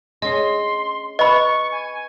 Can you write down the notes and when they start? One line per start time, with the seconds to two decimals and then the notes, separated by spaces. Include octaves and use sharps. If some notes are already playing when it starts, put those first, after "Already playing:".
0.22 C#4 G#4 D#5 C6
1.19 B4 D#5 B5 C#6
1.72 G#5